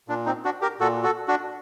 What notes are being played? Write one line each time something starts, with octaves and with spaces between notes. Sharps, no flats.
A#2 D4
C4 D#4
D4 F#4
G4 A#4
A#2 F#4 A4
F#4 A4
D4 F#4